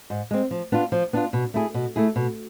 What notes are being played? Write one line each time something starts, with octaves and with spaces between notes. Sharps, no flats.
G#2
G#3 C4
F3
B3 D4 F4
F3
B3 D4 F4
B2
A3 E4 G#4
B2
A3 E4 G#4
B2